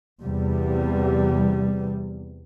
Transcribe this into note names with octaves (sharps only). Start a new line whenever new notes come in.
E2 C3 G3